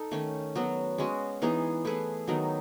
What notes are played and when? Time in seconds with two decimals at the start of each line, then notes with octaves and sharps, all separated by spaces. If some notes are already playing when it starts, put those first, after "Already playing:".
Already playing: D#4 A4
0.11 D#3 A3 C#4
0.55 F#3 B3 F#4
0.98 G#3 C#4 F#4
1.42 E3 B3 D#4 G#4
1.85 A3 E4 G#4 B4
2.28 D#3 F#3 B3 D#4